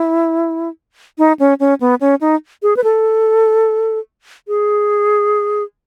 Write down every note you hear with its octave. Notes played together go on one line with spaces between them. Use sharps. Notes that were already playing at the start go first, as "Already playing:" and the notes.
Already playing: E4
D#4
C#4
C#4
B3
C#4
D#4
G#4
B4
A4
G#4